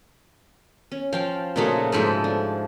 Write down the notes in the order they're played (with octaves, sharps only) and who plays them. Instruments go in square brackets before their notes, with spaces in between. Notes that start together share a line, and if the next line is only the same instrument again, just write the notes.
[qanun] C#4
[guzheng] F3 [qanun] F5 G5 A5
[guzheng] A#2 A3 G#4 [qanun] C#3 D#4 F#4
[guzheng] G#2 F3 A3 [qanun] A4 B4
[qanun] D4